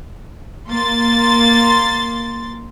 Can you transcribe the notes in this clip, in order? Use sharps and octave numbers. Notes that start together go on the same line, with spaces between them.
A#3 C6 A6